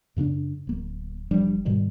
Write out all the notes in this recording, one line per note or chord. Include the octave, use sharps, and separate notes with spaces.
F#2 C#3 C#4 D4
D1 A#3
F#1 F3 G3 D4
G#2 B2 D#3 G3